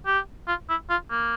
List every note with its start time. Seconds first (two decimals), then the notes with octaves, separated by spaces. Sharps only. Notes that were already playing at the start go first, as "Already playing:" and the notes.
0.06 G4
0.48 F4
0.69 E4
0.90 F4
1.11 A#3